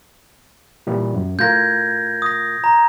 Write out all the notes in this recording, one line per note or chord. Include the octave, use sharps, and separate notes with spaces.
A#2 E3 G3
F#2
A2 F4 A#4 G6 G#6 A#6
D#6 A#6
A#5